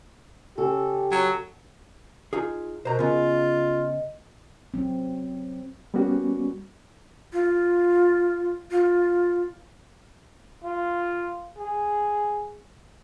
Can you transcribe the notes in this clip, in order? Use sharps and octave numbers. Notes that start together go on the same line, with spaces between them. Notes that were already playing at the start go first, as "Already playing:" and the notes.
C#3 G4 A4
F#3
D#4 F4 G#4
B2 A#4 C5 A#5
C#3 B3 F4 D#5
F#3 C4
G3 A#3 B3 C#4 F#4
F4
F4
F4
G#4